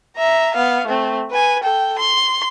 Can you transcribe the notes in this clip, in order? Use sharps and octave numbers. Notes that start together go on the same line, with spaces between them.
E5 A#5
B3 F5
A3 C4
B4 G#5
A4 G5
C6